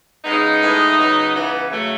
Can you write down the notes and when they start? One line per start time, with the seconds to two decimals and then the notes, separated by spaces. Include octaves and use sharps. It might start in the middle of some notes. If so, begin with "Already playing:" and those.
0.25 C#3 G#3 B3 D#4
0.61 A2 E3 G#3
0.97 C#3 F#3 B3
1.34 C#3 E3 B3
1.70 C#3 F#3 A3